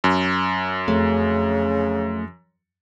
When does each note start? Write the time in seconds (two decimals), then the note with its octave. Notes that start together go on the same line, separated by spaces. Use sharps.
0.04 F#2
0.88 F2 C#3 A3